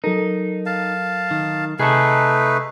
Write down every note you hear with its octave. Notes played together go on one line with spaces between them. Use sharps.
F#3 D#4 A4 A#4
F5 A5
D#3
C3 A3 D#4 G#4 A4 B4